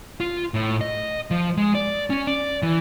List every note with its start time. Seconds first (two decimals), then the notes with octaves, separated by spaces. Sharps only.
0.21 F4
0.54 A2
0.81 D#5
1.31 F3
1.57 G#3
1.75 D5
2.10 C#4
2.27 D5
2.63 E3